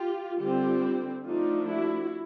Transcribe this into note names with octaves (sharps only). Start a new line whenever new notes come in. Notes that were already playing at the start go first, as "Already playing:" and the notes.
Already playing: F4 G4
D3 G3 C4 F4 G4
F3 A3 D4 D#4 F4
E4 F#4